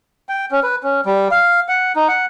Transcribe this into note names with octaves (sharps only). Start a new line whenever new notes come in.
G5
C#4
B4
C#4
G3
F5
F#5
D#4
F#5